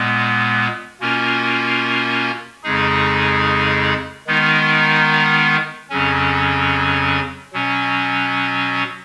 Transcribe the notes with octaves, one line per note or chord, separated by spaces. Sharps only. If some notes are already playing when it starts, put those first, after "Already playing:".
Already playing: A#2 G#3 B3
B2 A#3 C#4 F4 A#4
F2 C#3 G#3 D#4 G#4
D#3 G#3 B3 D#4 A#4
F2 C#3 F#3 C#4
B2 F#3 C#4